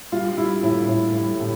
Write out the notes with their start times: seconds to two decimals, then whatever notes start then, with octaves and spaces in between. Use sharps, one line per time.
0.12 G3 F4
0.37 G3 E4
0.63 A2 E4
0.89 A2
1.15 G3
1.40 A2